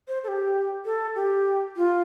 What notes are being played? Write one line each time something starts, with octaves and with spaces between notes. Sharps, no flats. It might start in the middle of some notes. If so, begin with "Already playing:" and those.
C5
A4
G4
A4
G4
F4